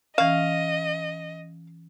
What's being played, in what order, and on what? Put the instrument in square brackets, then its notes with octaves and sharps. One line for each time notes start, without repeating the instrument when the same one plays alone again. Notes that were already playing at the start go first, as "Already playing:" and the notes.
[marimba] E3 C#4 [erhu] D#5 [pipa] F5